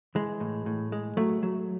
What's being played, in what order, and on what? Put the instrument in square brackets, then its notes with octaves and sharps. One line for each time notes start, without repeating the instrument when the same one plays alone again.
[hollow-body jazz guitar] E3 G#3
A2
A2
G#3
F#3 A3
F#3